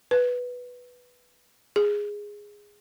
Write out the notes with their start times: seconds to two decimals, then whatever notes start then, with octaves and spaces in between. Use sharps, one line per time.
0.11 B4
1.76 G#4